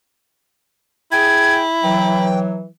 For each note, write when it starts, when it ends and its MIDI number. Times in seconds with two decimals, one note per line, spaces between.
1.12 2.27 64
1.12 1.62 68
1.12 1.62 79
1.12 1.56 92
1.83 2.66 52
1.83 2.66 54
1.83 2.39 79